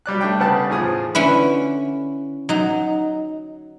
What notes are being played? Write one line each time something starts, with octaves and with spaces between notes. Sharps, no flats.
F#3 G3 D5 F#6
A3 D4 G5
C#3 G3 B3 F#5 A5
E2 A2 F3 G#4 D#6
D3 C#4 E4 B4
F#3 D#4